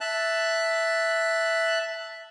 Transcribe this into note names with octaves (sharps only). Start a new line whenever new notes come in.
E5 A5 F#6